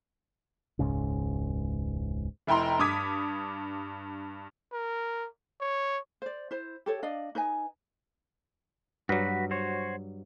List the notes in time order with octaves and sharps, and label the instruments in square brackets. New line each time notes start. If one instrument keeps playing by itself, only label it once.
[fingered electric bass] E1 C#2 G#2 C#3
[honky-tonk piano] F1 E4 G5 A#5 C6
G2 D6 D#6 G#6 B6
[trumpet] A#4
C#5
[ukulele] C5 D5
E4 C5
G4 A4 C#5
D4 D5 D#5 F5
D#4 B4 D#5 G#5
[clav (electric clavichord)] G2 F#3 [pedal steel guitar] F#4 B4
[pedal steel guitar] F#4 C5 C#5